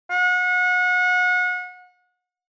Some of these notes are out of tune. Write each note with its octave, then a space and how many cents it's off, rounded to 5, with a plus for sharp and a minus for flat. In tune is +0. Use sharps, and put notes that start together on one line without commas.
F#5 -35